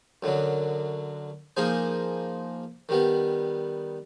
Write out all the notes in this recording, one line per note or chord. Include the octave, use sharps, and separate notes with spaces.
F#2 D3 F#3
F3 A#3 D#4 G#4 C5
D#3 G3 B3